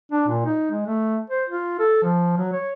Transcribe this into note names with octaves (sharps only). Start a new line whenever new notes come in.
D4
A#2
D#4
G#3
A3
C5
F4
A4
F3
F#3
C#5